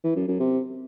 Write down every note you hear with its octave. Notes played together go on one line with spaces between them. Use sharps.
E3
F#2
F#2
C3